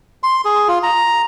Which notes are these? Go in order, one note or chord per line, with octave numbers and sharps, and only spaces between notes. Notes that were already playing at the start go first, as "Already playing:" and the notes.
C6
G#4
F4
A#5